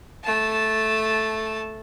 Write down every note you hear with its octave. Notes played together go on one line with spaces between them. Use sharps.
A3 A5